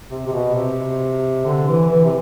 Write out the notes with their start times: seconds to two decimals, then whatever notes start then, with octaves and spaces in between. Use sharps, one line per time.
0.10 C3
0.27 C3
0.32 B2
0.55 C3
1.45 D3
1.68 E3
1.90 E3
2.05 C3